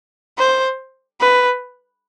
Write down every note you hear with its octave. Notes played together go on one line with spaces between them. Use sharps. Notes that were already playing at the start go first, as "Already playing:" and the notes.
C5
B4